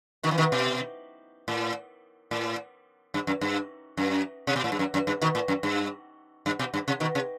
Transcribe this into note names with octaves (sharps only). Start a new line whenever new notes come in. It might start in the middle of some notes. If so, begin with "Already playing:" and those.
B2 D#3
E3
B2 D#3
B2
A2
A2
G2
F#2
G2
F#2
C3
B2
A2
G2
F#2
F#2
G2
B2 D#3
A2
F#2
G2
G2
B2
G2
C3
B2 D#3
C3